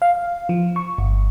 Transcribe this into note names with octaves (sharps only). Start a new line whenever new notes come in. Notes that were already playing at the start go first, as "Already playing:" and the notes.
F5
F3
C#6
G1